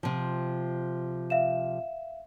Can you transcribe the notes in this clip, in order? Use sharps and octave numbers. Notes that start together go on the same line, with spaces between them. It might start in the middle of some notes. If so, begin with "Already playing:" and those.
C3 F3
E5 F5 E7